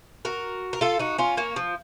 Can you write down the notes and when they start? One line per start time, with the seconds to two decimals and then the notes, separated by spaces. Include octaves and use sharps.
0.25 F#4 A#4
0.73 A#4
0.81 F4 A4
0.99 D#4 F#4
1.18 C#4 F4
1.37 A#3 C#4
1.56 F3